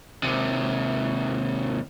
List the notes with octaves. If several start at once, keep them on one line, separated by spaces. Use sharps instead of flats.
D#2 C3